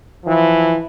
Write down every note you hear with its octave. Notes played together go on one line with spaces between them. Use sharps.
E3 F3